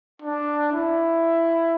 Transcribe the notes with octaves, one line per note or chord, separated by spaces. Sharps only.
D4
E4